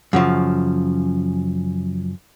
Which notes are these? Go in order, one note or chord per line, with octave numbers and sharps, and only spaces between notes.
F#2 C#3 F3